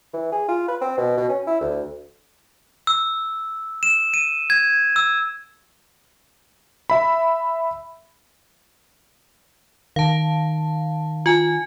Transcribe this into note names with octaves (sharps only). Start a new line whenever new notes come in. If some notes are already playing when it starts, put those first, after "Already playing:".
E3
G#4
F4
B4
C4
B2
B2
C#4
E4
D2
E6
E7
D#7
G#6
E6
E5 B5
D#3 F5 A5
F4 G#5